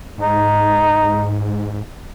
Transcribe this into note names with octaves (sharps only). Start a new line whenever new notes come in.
G#2 D#4